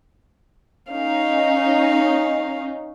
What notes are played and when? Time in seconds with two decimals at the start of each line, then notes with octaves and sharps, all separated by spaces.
0.91 C#4 D#4 F5